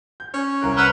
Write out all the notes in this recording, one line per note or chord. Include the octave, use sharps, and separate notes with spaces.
G6
C#4
C2 A#4 F#6
B4 F#5 E6 F6 F7